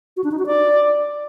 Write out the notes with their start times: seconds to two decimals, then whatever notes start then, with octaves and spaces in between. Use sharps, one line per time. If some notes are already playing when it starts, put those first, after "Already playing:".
0.17 F#4
0.24 D4
0.32 D#4
0.39 F#4
0.46 D5